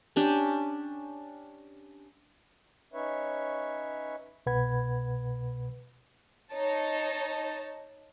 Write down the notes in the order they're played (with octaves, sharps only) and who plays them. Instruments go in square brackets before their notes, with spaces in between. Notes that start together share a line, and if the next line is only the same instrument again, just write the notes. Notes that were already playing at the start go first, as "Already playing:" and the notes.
[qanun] C#4 D4 G4
[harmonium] C#4 D#4 B4 C#5 E5
[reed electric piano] C2 B2 B4 F#5 B5 G#6
[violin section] D#4 C#5 A5